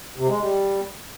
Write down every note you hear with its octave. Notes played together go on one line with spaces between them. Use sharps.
C3
G#3
G3